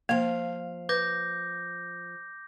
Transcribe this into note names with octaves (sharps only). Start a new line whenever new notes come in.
F3 A#3 F5
B4 D6 G6 A#6